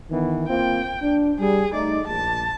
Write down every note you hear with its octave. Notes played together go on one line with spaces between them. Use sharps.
D#3 E3 B3
A#3 C4 F4 G5
D4
G3 G#4
A3 D#4 D5
A#1 A5